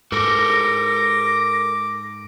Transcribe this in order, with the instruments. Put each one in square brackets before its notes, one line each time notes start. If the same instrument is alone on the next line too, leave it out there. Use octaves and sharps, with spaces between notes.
[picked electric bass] G#2 [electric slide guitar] A4 A#4 [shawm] D6 [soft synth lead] A#6